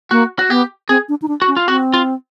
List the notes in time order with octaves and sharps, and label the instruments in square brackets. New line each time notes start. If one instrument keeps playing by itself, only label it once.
[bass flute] A#3 [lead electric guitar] F#4
[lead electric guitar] F#4
[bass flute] B3 [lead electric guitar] G4
[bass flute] C4 [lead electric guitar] G#4
[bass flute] D4
D#4
D4
[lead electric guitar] F#4
[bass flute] C#4
[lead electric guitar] F4
[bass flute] C4 [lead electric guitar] F#4
[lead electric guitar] F4